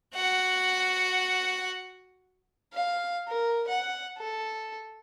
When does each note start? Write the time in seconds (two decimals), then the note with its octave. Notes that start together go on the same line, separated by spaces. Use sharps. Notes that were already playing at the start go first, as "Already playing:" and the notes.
0.15 F#4 F#5
2.73 F5
3.29 A#4
3.68 F#5
4.18 A4